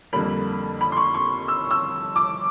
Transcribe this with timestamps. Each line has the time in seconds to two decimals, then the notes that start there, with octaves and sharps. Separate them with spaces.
0.13 F2 D3 G3 A#3 B5
0.81 B5
0.92 C6
0.97 C#6
1.14 C#6
1.48 E6
1.71 E6
2.16 D6